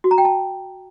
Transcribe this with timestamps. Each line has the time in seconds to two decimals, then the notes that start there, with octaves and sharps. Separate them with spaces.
0.04 F#4
0.11 A#5
0.18 G5
0.25 A5